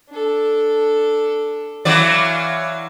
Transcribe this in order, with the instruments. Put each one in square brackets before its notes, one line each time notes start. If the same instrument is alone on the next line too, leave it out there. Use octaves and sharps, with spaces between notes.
[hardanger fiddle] D4 A4
[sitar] E3 F#3 D5 [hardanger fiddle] C#5 F5